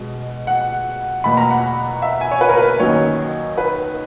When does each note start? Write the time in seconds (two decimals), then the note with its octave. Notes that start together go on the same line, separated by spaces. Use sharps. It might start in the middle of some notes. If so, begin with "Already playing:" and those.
Already playing: B2 G#3
0.47 F#5
1.24 E2 B2 F#3 A#3 B5
1.37 A#5
1.50 F#5
2.02 E5
2.21 G#5
2.31 C#5
2.41 B4
2.49 A#4
2.57 B4
2.79 F#2 D#3 F#3 A#3 C#5
3.58 B4